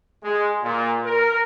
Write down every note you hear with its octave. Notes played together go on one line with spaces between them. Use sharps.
G#3
A#2
A#4